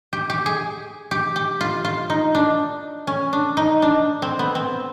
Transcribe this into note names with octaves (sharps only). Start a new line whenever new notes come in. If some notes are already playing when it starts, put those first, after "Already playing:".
G4
G4
G#4
G4
G4
F4
F4
D#4
D4
C#4
D4
D#4
D4
C4
B3
C4